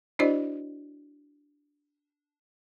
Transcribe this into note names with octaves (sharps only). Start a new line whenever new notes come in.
D4 E4 F#4 C5 D5 D#5